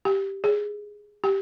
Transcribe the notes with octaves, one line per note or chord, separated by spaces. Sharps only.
G4
G#4
G4